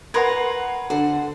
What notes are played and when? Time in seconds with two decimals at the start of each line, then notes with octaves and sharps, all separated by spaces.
0.14 A#4 B4 F#5 A#5 C6 G#6
0.90 D3 C5 F#5